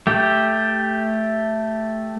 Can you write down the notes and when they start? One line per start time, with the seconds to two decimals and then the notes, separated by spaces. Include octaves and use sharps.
0.07 A3 G4